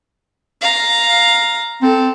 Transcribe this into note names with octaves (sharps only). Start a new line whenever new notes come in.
F5 A#5
C4 A4